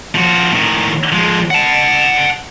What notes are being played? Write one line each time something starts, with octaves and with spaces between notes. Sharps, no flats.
F3 F#4
A2 D#3
F3 G#3
F#5 A5